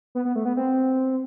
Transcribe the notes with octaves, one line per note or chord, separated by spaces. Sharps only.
B3
B3
A3
B3
C4